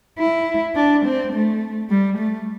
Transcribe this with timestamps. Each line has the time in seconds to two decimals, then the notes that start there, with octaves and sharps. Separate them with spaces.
0.19 E4
0.76 D4
1.05 C4
1.33 A3
1.90 G3
2.18 A3